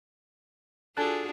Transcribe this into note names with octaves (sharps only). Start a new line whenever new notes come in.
D4 F4 F#4 G#4 A4 G#5 A5 F#6